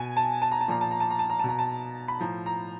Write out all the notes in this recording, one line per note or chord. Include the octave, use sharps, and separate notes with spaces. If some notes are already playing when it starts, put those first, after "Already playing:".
Already playing: B2 G#5
A5
A5
A#5
A5
A#2 F3 A#5
A5
A#5
A5
A#5
A5
A#5
B2 A5
A#5
A5
B5
A2 F3 A#5
A#5